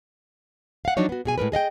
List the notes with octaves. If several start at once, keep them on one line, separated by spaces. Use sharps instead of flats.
F5 F#5
F3 F#3 D4 D#4 C#5
B3 F#4
B2 G#4 G#5
A2 G#3 A#4 B4
G#4 D#5 F5 G5